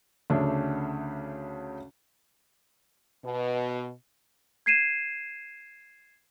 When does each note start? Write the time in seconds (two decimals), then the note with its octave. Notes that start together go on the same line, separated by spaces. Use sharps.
0.30 D2 C#3 A3 D4
3.24 B2
4.66 G#6 C7 D#7 E7